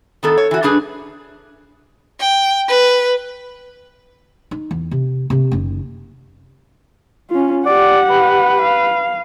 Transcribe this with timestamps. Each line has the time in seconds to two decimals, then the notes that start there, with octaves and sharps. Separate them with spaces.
0.23 D#3 B3 A4
0.37 C#5
0.51 E3 F#4
0.63 G2 G3 D4 G#4 B4
2.20 G5
2.68 B4
4.51 D#4
4.71 E2
4.91 C3
5.30 C3 A#3
5.51 F#1 D#3
7.30 C#4 F4
7.66 G4 D5 F#5
8.10 B4
8.62 F5